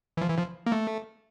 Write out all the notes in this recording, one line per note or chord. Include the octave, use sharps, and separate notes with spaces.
E3
F3
E3
F3
A#3
A3